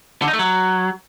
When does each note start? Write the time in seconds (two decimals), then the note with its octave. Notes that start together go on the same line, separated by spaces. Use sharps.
0.22 D3
0.28 D#4
0.33 A3
0.39 F#3